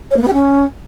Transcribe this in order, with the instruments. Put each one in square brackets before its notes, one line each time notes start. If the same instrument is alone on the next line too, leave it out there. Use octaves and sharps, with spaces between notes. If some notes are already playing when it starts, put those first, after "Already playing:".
[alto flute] C#5
A#3
B3
G4
C#4